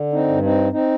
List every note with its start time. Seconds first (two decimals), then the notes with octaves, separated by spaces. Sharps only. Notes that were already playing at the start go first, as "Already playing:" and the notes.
Already playing: D3
0.12 C4 D#4
0.28 G2
0.43 C4 D#4
0.72 C4 D#4